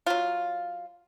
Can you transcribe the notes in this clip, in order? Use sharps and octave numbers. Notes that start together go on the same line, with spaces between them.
F#3 F4